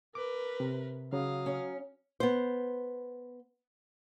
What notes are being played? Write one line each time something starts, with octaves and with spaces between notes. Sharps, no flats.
A#4 B4 D6
C3
C#3 F#3 F5 D#6
C#4
B3 C5